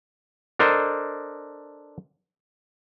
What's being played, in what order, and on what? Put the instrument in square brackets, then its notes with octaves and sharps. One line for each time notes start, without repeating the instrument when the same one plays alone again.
[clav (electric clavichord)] D4 A4 A#4 C5 D#5